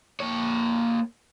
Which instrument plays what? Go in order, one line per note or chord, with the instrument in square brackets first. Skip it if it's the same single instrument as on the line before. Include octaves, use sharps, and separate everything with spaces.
[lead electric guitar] A#3 C#5